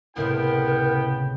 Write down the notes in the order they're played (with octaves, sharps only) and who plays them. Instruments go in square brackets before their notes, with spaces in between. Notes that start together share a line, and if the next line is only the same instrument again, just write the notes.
[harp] C#2 A2 C3 [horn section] B3 G5 [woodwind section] E4 [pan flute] A#4